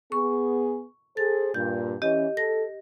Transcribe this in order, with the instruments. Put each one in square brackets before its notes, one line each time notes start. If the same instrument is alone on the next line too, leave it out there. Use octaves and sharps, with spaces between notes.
[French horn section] B3 G#4 [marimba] C#6
[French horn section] G#4 A4 C5 [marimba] A6
[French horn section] G2 A#2 [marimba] G6
[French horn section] E3 C#4 [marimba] G4 D#5
[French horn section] A4 [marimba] A#6